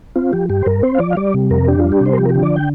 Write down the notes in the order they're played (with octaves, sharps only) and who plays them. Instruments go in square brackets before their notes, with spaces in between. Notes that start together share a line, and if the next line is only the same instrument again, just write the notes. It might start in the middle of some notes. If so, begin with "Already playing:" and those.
[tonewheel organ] C4 F4
F3 G4
G2 G4
C5
G2 A#4
C4 C5
F5
F3 D5
F5
G3 D5
C3
F2 A#4
D4 G4
F4
G3
G4
C3
C5
A#4
F3 G4
A#4
G4
D3
D5
G5